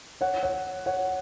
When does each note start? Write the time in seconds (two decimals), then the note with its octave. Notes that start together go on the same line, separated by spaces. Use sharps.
0.21 C#5 F#5
0.43 C#5 F#5
0.86 C#5 F#5